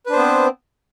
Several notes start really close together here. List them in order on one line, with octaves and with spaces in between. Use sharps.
B4 D4 C5 B3 C4